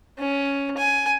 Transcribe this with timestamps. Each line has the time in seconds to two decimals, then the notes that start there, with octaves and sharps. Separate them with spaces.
0.19 C#4
0.77 G#5